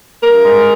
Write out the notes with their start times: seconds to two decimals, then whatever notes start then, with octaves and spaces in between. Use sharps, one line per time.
0.23 G2 A#4
0.44 G#3